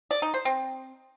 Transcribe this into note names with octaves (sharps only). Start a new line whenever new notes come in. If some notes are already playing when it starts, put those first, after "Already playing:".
D5
D#4
C5
C4